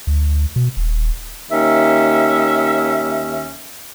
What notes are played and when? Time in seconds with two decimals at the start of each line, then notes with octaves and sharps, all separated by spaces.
0.07 D2
0.56 B2
0.77 D#1
1.52 D#2 C#4 E5